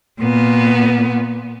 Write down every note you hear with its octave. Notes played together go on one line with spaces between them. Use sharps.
A#2 B3